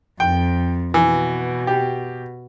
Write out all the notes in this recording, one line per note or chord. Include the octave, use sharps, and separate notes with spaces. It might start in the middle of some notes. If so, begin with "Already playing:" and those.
F2 G5
B2 E3
G4